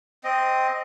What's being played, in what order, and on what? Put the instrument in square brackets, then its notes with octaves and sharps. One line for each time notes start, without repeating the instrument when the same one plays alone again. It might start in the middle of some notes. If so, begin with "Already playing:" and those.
[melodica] C4 D#5